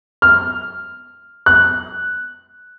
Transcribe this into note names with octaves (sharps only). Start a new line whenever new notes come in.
F6
F#6